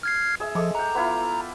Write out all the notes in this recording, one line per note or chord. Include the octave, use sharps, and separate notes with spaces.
F6 G#6 C7
G#4 E5
F3 G#3 A4 D6
F#5 G5 A#5
B3 E4 F4